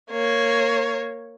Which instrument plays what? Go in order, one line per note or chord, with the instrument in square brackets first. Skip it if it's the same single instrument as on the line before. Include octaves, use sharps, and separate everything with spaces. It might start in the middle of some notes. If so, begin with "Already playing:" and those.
[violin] A#3 C#5